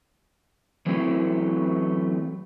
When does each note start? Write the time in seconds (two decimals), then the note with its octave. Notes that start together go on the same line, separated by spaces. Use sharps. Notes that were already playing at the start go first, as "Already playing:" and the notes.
0.86 E3 F#3 A3 C4 E4